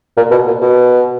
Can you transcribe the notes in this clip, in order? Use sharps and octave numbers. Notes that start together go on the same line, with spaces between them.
A#2
B2
A#2
B2